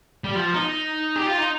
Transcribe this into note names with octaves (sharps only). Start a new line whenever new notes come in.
G3
F3
D#4
G4
F4
D#4